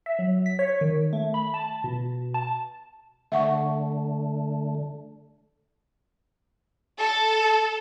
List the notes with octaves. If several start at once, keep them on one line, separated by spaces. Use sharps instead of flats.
E5
F#3
B6
C#5
D#3
A3
B5
A5
B2
A5
D3 A3 E5 F#5 C#6
A4